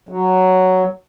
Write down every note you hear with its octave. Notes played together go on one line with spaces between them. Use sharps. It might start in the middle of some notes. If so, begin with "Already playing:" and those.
F#3